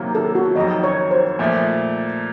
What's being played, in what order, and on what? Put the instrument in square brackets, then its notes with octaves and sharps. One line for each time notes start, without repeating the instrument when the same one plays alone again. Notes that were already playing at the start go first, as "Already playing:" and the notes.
Already playing: [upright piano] C3 D#3 F#3 A#3
[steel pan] A4
F#4
[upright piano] F2 D#3 F#3 [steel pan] D#5
[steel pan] C#5
C5
[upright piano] A#2 F3 A3